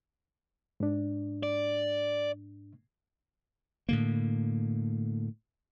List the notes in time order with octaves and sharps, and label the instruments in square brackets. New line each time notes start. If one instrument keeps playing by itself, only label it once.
[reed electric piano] G#2 D4
[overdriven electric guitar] D5
[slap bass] A2 D3 A#3